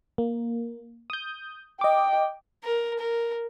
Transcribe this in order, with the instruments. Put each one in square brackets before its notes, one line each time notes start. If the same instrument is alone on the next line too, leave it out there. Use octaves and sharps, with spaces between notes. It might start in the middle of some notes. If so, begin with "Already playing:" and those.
[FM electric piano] A#3
D#6 G6
[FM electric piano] D#5 D6 [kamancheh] G5
[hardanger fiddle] A#4
A#4